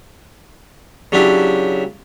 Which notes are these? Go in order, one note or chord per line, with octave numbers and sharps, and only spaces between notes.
C#3 F#3 D4 E4 G4